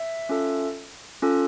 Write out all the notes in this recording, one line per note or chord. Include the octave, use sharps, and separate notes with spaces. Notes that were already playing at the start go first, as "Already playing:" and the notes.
Already playing: E5
C#4 F4 A4
C#4 F4 A4